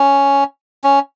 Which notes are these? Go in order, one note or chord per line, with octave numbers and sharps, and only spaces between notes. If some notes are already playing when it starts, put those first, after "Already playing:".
Already playing: C#4
C#4